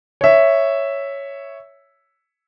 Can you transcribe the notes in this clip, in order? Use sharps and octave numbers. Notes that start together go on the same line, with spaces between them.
C#5 E5